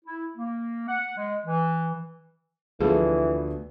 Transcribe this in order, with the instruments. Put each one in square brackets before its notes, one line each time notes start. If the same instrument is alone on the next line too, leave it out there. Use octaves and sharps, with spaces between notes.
[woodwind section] E4
A#3
F#5
G#3
E3
[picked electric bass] D2 [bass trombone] E3 [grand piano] F3 A3 B3 [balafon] G#4